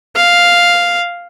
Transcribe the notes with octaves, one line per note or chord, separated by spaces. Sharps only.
F5